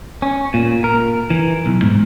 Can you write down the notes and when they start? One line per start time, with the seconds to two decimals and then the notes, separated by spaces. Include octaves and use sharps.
0.22 C#4
0.54 A#2
0.84 A#4
1.30 E3
1.66 B1
1.82 G#2